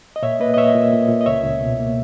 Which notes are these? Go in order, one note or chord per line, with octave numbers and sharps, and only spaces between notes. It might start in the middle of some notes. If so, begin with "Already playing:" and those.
D#5
A#2 C#5 E5
A#3 B4 D#5
D#5
A#2 C#5 E5
A#2
A#2
A#2
D#5
C#2 C#5 E5
C#2
B2
A#3